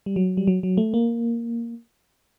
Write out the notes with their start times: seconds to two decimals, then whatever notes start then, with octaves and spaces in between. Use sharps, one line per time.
0.06 G3
0.16 F#3
0.37 G3
0.47 F#3
0.63 F#3
0.77 A3
0.94 A#3